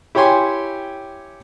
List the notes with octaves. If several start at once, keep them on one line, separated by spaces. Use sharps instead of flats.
E4 G4 C#5 G5 G#5 C6